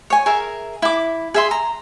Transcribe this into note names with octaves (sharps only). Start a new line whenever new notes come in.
C#5 G#5
G#4 A#4 E5
E4 D6
G#4 E5 C6
A#5